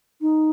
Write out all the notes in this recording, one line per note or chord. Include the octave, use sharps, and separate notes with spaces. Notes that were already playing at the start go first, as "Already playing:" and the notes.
D#4